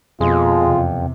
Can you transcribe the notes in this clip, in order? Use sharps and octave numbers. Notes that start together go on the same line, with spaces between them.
F2 B2 G#3 F4
E2 C3